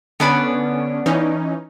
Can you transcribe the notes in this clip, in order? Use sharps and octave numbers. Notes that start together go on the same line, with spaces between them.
D3 B3 C#4 D4 B5
E3 C#4 D#4